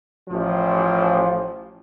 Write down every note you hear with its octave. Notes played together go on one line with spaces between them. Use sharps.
A1 F3